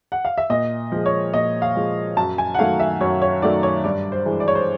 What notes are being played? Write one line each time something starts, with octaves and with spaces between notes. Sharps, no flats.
F#5
F5
E5
A#2 D#5
F3 G#3
C#5
A#2 D#5
F5
F3 G#3
F#2 A5
G#5
F#5
D#3 F#3 A3 F5
E5
F#2 C#5
C#5
D#3 F#3 A3 D5
C#5
G2 D5
C5
E3 G#3
D5
C#5
C5